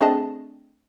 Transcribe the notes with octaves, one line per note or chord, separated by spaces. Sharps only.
A3 C4 D4 G#4 D#5 A5